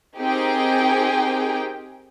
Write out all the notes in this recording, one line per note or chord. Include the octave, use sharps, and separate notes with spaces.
C4 D#4 G4 G#4 A#4 G5